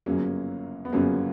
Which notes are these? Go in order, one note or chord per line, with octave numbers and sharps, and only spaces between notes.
G1 F#2 C#3 F#3 A#3 C#4
B3
G1 F#2 C#3 F#3 A#3 C#4